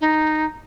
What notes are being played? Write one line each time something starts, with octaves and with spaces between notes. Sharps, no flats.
D#4